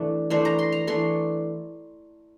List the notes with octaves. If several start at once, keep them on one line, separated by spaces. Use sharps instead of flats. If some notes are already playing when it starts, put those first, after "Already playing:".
Already playing: E3 A3 D4
E3 A3 D4 C5
A#5
C6
A#5
E3 A3 D4 C6